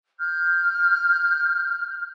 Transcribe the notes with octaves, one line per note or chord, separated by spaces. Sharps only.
F6 G6